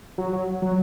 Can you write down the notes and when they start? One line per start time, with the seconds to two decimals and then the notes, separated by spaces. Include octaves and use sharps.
0.18 F#3
0.33 F#3
0.62 F#3